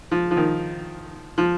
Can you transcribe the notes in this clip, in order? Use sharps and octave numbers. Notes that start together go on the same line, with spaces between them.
F3
F3
D#3
F3